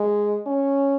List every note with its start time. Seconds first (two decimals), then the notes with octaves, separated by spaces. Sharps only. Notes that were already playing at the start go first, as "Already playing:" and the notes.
Already playing: G#3
0.46 C#4